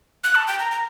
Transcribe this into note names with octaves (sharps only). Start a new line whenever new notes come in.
F#6
A5
G5
A#5
A#5